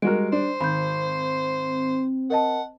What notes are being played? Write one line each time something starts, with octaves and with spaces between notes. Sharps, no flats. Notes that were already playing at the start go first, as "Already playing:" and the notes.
G3 G#3 F#4 A#4 D7
D4 C5
G#1 C4 B5 G6
A#4 D#5 F#5 A5